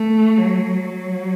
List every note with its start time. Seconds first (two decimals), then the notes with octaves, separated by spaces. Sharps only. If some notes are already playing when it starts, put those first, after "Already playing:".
Already playing: A3
0.38 F#3
0.87 F#3